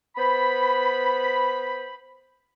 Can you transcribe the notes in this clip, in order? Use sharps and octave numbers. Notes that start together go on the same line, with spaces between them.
B3 C5 B5